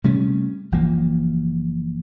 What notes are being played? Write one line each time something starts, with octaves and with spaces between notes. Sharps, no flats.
C3 G3 A3 C#4
F#1 E3 F3 A#3